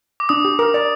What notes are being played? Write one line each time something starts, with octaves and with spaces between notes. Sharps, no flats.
D6
D4 D#6
G4
A#4
D5